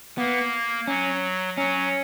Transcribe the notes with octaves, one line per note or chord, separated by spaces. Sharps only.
A#3 B3
F#3 C#4
F#3 C#4